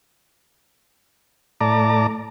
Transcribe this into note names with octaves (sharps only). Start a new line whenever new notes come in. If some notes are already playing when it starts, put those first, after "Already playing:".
A2 D5 A5 A#5 D6